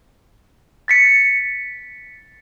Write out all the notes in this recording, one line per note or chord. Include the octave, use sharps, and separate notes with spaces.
A6 B6 C#7